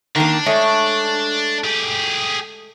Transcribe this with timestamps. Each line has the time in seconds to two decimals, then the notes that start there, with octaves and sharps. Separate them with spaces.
0.16 D#3 A#3 D4
0.46 G#3 A3 C#5
1.64 G4 G#4